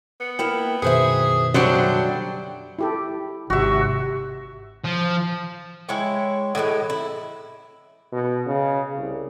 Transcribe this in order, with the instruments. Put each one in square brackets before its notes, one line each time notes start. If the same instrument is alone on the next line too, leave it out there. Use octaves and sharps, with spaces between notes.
[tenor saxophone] B3
[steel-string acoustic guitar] A#3 E4 A#4 [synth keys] G5
[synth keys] F#2 B2 D#3 [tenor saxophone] G#4 [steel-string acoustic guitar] B4 C5 E5
[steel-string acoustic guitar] D3 F#5 G5 [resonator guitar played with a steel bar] F#3 G3 D4 [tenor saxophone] C5
[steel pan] E4 G4 A4
[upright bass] G#1 [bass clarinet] C3 [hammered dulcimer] F#4 E5
[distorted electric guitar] F3
[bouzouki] G#3 E4 C#5 G5
A2 E3 G3 G#3
E4
[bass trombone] B2
C#3
C2